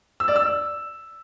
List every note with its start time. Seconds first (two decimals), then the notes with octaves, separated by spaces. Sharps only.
0.20 E6
0.28 D5
0.36 E6